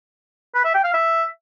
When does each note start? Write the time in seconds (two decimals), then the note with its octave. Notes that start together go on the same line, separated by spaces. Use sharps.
0.55 B4
0.65 E5
0.74 G5
0.84 F5
0.94 E5